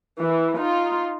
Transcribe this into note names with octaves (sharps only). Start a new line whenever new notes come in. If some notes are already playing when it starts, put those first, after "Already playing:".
E3
D#4 F4